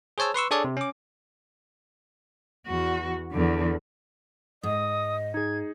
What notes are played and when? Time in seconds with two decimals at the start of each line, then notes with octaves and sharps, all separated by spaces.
0.18 G#4 C5 C#5 A5 E6
0.34 B4 C6 C#6 E6
0.51 D4 G#4 A4 C#5 D5
0.64 C3
0.77 C#4 D6
2.66 E2 F#4
3.31 E2 D3
4.63 G#2 D#5 D#6
5.34 D#4 G#4 G#6